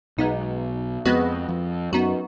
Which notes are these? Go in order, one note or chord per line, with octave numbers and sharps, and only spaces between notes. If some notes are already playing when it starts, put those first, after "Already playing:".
B1 B2 G#3 B3 D#4
F2 G#3 B3 F#4 B4 D#5
F2
F#2 B3 D#4 F#4